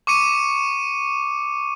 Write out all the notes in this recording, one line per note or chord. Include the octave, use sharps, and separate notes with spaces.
C#6 D6 C#7 D#7